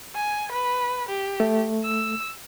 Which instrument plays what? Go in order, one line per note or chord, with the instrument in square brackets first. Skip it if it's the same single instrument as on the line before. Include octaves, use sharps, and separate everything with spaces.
[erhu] G#5
B4
G4
[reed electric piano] A3
[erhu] E6